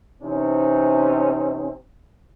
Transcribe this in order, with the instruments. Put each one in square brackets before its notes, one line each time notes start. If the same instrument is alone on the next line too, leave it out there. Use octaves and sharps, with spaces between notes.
[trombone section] C3 E3 C4 C#4 D#4